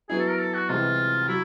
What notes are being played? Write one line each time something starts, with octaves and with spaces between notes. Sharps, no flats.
F#3 B3 E4 G#4
A4
A#4
A4
F#4
C2 C3 E3 G#3 F4
F#3 E4